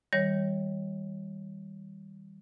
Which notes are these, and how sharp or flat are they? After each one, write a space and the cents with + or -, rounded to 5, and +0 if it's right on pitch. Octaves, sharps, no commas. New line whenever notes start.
D#3 +35 G3 +0 C#5 +0